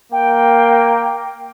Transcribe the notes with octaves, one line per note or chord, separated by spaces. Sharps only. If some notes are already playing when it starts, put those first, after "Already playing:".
A#3 G5